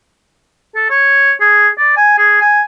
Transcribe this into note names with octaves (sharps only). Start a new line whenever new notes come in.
A4
C#5
G#4
D5
G#5
G#4
G#5